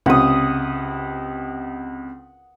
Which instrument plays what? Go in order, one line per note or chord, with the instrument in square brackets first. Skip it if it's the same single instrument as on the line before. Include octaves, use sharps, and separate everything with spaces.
[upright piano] C#2 C3 [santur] F#5 D#6